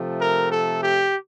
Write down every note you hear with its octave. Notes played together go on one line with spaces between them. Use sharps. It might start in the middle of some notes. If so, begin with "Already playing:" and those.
Already playing: C3 F3 A3
A#4
A4
G4